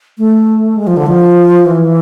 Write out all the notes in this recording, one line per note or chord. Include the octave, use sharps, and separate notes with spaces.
A3
G#3
F3
D3
F3
E3